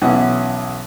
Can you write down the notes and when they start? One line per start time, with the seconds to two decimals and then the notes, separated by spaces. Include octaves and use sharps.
0.02 B1 E3 C#4 F#5